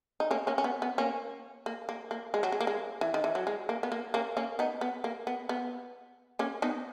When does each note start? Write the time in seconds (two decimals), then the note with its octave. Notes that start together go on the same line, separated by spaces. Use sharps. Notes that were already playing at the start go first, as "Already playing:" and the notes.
0.20 D#4
0.31 A#3 C#4
0.47 A#3 C#4
0.58 C#4
0.64 B3
0.82 B3
0.98 A#3 C#4
1.66 A#3
1.89 A#3
2.11 A#3
2.34 G#3
2.43 F#3
2.52 G#3
2.61 A#3
2.67 G#3
3.01 E3
3.14 D#3
3.24 E3
3.35 F#3
3.47 G#3
3.69 A#3
3.83 B3
3.92 A#3
4.14 A#3 C#4
4.37 A#3 C#4
4.59 B3 D#4
4.81 B3
5.04 A#3
5.27 B3
5.49 B3
6.39 A#3 C#4
6.62 B3 D#4